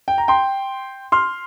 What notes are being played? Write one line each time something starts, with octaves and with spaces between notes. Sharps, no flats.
G5
A#5
G5 C6
C6 F6